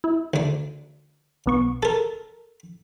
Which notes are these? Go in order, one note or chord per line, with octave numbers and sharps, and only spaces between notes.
E4
D2 D4
B1 B3 C#6
A4 A#4 A5